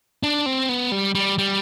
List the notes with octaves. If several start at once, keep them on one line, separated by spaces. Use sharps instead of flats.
D4
C4
B3
G3
G3
G3